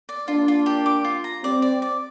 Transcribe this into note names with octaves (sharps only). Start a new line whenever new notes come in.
D5
A#3 D4 F4
F4
G4
D6
F4
A#5
G3 C4 D5
D5
D5